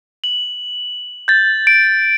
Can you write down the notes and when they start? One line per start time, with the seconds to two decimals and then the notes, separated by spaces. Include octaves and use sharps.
0.24 F#7
1.28 G6 A6
1.67 D7